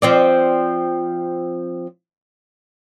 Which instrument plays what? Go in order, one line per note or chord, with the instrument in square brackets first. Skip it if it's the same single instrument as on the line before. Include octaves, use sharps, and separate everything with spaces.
[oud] F3 C4 D5